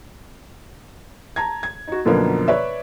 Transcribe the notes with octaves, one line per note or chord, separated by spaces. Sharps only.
A5 A#5 G#6
G#6
D#4 F#4
F#2 B2 D3 F3 A#3 B3
B4 C#5 D5 E5